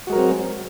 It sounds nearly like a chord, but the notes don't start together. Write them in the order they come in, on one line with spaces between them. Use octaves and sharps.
F#4 G#3 A#4 F#3 C4